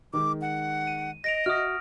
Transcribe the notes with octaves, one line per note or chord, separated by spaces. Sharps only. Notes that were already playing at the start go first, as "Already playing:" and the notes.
D#3 G#3 D6
F#5
D#7
D#5 A#6 D7 F7
F#4 E5 D#6 F6